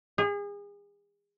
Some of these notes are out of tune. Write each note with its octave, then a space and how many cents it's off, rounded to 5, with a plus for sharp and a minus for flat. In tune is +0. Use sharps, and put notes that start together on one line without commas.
G#4 -35